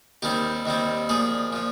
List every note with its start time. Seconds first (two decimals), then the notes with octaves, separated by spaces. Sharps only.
0.22 D#2 D#3 G3 C4 G4
0.66 D#2 D#3 G3 C4
1.09 A#2 F3 A#3 G#4
1.53 A#2 F3